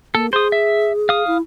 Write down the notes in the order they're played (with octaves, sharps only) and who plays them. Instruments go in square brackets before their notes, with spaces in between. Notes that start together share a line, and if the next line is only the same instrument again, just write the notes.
[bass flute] A#3 [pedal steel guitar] A4
[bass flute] G#4 [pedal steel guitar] C5 D#6
[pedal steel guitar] E5
F5 D#6
[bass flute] E4